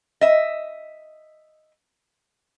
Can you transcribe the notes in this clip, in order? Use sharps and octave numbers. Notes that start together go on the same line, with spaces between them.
D#5 E5